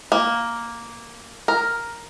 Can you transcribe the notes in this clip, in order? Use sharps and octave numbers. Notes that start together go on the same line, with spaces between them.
A#3
A#4